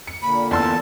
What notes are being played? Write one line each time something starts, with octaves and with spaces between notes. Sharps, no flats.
C#7
A#2 D3 A#3 B5
E2 A5 C6 E6